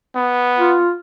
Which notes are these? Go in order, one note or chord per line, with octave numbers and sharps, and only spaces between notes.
B3
F4